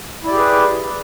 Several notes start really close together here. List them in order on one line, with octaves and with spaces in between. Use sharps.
E4 D5 G4 G#4 B4